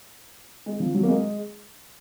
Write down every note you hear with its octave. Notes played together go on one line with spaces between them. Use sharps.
G#3
F3
F#3
A#3
G#3